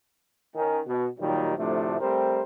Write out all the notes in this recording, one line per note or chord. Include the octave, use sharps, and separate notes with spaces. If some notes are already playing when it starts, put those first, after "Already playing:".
D#3 C#4
B2
D#2 A#2 D#3 F#3 G3 D#4
D2 A2 C3 F3 A3 D4
G3 A3 C4 A#4 C5